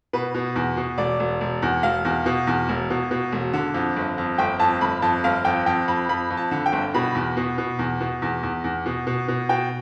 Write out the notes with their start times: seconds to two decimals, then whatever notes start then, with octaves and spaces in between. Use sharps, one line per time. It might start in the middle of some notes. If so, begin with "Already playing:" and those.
0.13 B2 B4
0.34 B2
0.56 E2
0.77 B2
0.98 E1 D5
1.20 E1
1.41 E1
1.62 E2
1.83 E1 F5
2.05 E2
2.26 B2
2.47 E2
2.69 E1
2.90 B2
3.11 B2
3.32 E1
3.53 D3
3.74 F2
3.96 G1
4.18 F2
4.38 G1 G5
4.59 F2 A5
4.81 G1 B5
5.02 F2 A5
5.24 G1 F5
5.45 F2 G5
5.66 F2 G5
5.88 F2 B5
6.09 F2 B5
6.31 F2
6.37 A5
6.51 D3
6.66 G5
6.73 G1
6.94 B2 B5
7.15 E2
7.37 B2
7.58 B2
7.79 E2
8.01 B2
8.22 E2
8.43 E2
8.64 E2
8.86 B2
9.07 B2
9.28 B2
9.49 B2 G5